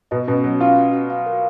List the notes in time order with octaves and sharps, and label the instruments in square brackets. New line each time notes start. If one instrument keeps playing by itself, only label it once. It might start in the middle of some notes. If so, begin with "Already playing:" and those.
[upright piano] B2 [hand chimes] D#5
[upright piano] B2 [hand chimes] C#4
[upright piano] F#3 [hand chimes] C#4
[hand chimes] C#4 [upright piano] F4
[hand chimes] F#4
F#4
F5
A#4